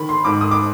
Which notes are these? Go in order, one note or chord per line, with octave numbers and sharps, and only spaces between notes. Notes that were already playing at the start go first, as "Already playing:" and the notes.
Already playing: D#3 B5
C6
G#2 D6
D#6
D6